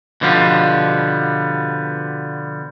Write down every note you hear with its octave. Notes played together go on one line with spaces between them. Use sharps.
B2 D3 F3 G3 B3